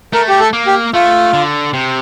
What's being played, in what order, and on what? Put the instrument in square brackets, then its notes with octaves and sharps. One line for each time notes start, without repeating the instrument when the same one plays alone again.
[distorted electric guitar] A3 [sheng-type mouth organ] A#4
[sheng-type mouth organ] G4
A4
[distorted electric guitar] A#3
[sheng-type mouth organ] G4
[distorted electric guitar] A3 [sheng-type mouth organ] F4
[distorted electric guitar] D3
C3